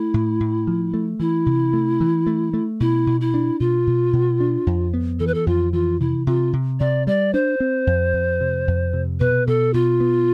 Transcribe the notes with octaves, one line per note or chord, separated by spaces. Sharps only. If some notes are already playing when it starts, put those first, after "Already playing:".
Already playing: A3 E4
A2
A2
F3
A3
E3 E4
C3
A3
E3
A3
A3
B2 E4
B2
E4
D4
B2 F4
B2
B2
D4
F2
B3
E3 A4
B4
A4
F2 F4
E3 F4
C3 E4
C3 F4
C3
C3 D5
G3 D5
D4 C5
C4
F2
F2
C3
F2
C3
B2 B4
B2 A4
B2 F4
B3